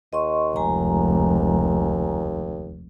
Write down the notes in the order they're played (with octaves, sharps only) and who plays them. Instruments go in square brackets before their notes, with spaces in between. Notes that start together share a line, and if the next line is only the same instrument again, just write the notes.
[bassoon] D#2 [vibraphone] D#5 C6 C#6
[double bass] F1 C#2 [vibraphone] G#3 G#5 A#5